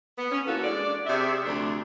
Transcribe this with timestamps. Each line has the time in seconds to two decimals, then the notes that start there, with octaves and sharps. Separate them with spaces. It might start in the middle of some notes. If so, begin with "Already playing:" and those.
0.17 B3
0.32 C#4
0.46 E3 A#3 F4 F#4 A4
0.64 G#3 D4 D5
1.06 C3 G#4 D5 E5
1.44 D2 F3 A3 D4